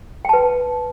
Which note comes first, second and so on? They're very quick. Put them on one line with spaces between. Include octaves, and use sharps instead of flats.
G5 A5 B4